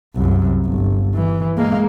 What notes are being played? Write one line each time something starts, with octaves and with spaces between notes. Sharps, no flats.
C2 F#2
G1
E3
G#3 A#3